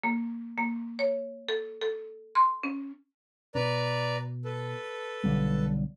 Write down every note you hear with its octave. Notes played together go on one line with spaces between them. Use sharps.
A#3
A#3
C#5
A4
A4
C6
C#4
B2 B4 D5 A#5
A4 B4
B1 D3 G3